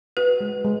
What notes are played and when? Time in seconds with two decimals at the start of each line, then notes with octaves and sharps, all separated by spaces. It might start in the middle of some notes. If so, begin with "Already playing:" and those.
0.17 F#4 B4
0.40 G#3
0.64 G#3